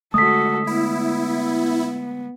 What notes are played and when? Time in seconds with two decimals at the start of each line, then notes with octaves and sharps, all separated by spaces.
0.14 D3 G#3 A3 F#4 A4 D#6 B6
0.67 B3 E4